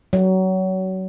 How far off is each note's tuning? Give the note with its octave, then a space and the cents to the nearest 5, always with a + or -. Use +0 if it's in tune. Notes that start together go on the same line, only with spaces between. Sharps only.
F#3 +25